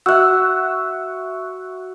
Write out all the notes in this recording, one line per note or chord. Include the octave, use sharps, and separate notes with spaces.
F#4 E5 E6 F#6